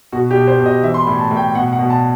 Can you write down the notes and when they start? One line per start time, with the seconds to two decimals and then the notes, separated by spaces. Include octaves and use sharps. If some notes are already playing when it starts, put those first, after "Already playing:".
0.12 B2 F#4
0.31 G4
0.36 B2
0.47 C5
0.59 B2
0.66 D#5
0.83 E3 E5
0.94 C6
1.01 B5
1.07 A2
1.19 A5
1.31 A2
1.37 G5
1.55 B2 F#5
1.73 F#5
1.79 B2
1.90 A5